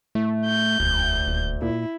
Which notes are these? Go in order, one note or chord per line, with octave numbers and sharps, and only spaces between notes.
A2 A3
G6
E1 D2
D#1
A#2 E4